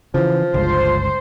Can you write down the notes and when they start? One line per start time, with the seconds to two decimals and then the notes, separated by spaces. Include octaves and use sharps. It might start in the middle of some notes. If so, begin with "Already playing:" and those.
0.14 C#3 E3 F3
0.54 G1 C#2 C5